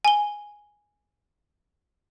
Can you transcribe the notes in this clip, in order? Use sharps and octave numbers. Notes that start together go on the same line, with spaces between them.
G#5 G7